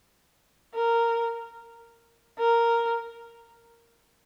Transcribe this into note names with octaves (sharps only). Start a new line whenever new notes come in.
A#4
A#4